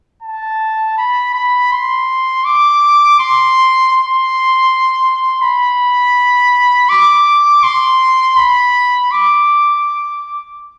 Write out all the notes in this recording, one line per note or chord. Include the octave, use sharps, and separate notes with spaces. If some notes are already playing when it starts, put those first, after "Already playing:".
A5
B5
B5
C6
D6
C6
C6
B5
D6
C6
B5
D6